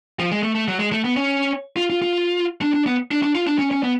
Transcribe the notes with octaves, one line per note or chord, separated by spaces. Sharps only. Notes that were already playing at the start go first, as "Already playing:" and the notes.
F3
G#3
A3
A3
F#3
G#3
A3
B3
C#4
F4
F4
F4
D4
D4
B3
D4
D4
F4
D4
C#4
C#4
B3